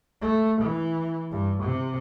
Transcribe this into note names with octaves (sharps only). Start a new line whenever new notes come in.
A3
E3
G2
C3